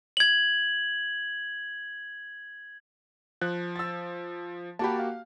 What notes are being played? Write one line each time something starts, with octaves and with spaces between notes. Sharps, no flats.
G#6 F#7
F3 F#6
E6 A6
A#3 F#4 G4 A5 B5
F5